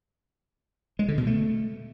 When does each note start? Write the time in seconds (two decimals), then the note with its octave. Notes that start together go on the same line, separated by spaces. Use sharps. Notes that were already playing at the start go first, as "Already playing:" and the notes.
0.99 G#3
1.08 D3
1.18 B2
1.27 A3